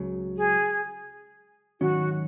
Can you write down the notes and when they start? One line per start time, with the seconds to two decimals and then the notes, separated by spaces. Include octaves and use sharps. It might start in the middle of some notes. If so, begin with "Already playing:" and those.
Already playing: C#2 C#3 F#3
0.37 G#4
1.81 G#2 D#3 F#3 C#4 F#4